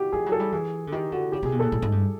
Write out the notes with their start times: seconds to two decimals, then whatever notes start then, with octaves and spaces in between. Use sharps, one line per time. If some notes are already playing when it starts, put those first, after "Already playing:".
Already playing: F#4 G4
0.12 F3 G#4
0.26 F#3
0.32 A4
0.40 G3
0.52 E3 G#4
0.87 D3
0.92 D#3 G4
1.12 D3 F#4
1.32 C#3 G4
1.43 C3 G#4
1.52 B2
1.60 A#2 A4
1.72 A2
1.82 G#2
1.92 G2